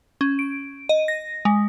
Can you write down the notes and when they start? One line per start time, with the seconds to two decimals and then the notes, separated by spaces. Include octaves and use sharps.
0.21 C#4
0.39 D7
0.89 D#5
1.08 A#6
1.45 G#3